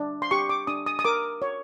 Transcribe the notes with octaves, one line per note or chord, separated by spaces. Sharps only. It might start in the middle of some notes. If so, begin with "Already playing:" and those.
Already playing: D4
C6
G4 C#6
D6
D4 D#6
D#6
D#6
A#4 D6
C#5